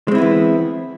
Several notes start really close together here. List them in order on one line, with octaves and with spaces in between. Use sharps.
G#3 C4 E4 B3 E3